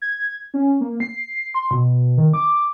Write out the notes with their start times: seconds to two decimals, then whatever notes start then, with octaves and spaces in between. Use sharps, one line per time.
0.02 G#6
0.54 C#4
0.81 A#3
1.00 C7
1.54 C6
1.71 B2
2.17 D#3
2.34 D6